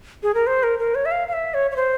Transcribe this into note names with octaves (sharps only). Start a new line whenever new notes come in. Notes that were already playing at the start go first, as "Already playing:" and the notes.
G#4
A#4
C5
A#4
A#4
C#5
E5
F5
F5
E5
C#5
C#5
C5